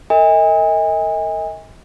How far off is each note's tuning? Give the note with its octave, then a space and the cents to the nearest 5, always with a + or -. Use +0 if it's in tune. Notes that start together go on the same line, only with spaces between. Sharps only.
A#4 -45 D#5 +40 G#5 -35